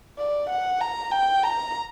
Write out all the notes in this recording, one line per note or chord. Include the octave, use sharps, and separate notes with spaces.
D5
F#5
A#5
G5
A#5